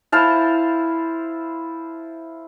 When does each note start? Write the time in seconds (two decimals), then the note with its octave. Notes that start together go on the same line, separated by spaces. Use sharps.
0.12 E4 C5 F5 A5